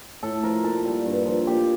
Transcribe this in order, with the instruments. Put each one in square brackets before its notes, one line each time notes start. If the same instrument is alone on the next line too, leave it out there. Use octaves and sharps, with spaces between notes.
[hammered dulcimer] A2 A4
F3 A#4
A#2 A4
G3
G2
F3
A#2 G4